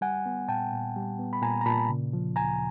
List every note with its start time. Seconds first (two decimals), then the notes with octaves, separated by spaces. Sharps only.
0.01 G3 F#5 G#5
0.26 B3
0.48 A#2 G5 A5
0.72 A#2
0.96 G3
1.19 B3
1.33 B5
1.42 A#2 G#5 A#5
1.61 A#5
1.66 A#2 A5 B5
1.89 C#3
2.13 F3
2.36 D2 G#5 A#5